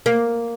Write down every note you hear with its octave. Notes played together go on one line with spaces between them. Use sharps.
A#3